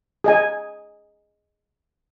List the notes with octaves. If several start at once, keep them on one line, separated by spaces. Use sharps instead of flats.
G#4 D#5 G#5